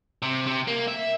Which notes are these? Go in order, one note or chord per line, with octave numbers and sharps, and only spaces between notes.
C3
C3
A#3
E5